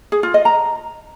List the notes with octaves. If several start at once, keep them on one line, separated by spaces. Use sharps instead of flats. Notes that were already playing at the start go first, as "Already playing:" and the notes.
G#4
F4
D#5
A#5